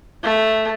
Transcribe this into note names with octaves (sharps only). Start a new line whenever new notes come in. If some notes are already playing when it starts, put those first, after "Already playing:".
A3